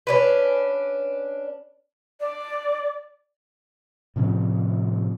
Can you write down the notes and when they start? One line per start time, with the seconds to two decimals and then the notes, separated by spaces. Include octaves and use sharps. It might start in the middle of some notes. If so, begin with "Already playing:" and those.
0.07 C#4 D4 B4
2.20 D5
4.16 A2 C3 F3 C#4